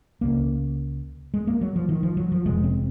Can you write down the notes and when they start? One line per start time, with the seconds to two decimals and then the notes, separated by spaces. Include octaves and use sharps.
0.21 C#2 C#3 A#3
1.34 G#3
1.47 A#3
1.61 F#3
1.76 F3
1.89 D#3
2.03 F3
2.17 F#3
2.32 F3
2.45 F1 F2 C3 G#3
2.64 C4